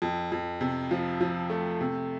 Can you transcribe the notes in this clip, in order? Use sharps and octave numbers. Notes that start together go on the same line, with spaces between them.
F2
F2
C3
F3
F3
A3
C3